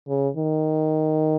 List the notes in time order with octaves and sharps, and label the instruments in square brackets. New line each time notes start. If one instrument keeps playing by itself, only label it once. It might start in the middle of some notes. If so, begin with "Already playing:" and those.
[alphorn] C#3
D#3